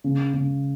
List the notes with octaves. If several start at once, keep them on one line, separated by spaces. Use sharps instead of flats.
C#3
C#3